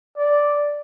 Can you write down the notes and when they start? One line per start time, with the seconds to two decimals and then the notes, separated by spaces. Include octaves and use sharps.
0.17 D5